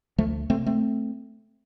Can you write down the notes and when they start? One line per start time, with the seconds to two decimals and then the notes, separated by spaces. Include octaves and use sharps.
0.18 D2 F3 A3
0.50 C3 A3 C4
0.66 A3 C4